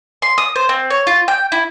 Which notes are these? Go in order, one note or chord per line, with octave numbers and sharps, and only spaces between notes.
C6
D#6
C5
C4
C#5
F4
G5
E4